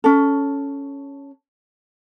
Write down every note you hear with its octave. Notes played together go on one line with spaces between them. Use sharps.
C#4 A4